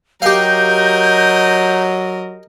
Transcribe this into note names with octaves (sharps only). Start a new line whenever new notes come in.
F#3 G4 A#4 D#5 F5 G6